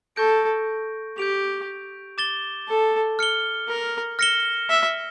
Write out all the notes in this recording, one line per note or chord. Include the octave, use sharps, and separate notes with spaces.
A4 C#6 G6 A#6 D7
G4 G6 D7 F7
D6 A6 E7 G7
A4
F6 C#7 G7
A#4
F6 A#6 C#7 E7 G7
E5